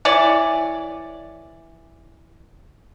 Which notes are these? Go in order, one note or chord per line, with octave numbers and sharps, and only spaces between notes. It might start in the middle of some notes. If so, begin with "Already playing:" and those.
E3 C#5 D5